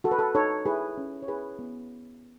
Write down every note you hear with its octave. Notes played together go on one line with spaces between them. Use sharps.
F#4 A4
B4
A4
D#4 A4 C#5
E4 G#4 B4
C#4
C#5
E4 G#4 B4
B3